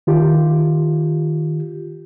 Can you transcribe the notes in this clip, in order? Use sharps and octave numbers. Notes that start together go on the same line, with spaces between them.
D#3 F4 G4